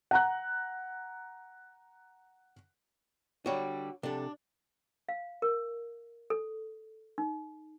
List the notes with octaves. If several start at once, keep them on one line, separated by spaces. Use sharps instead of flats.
F#5 A#5 F#6
D3 G3 F#4 C#5
C3 D4 A4
F5
A#4
A4
D#4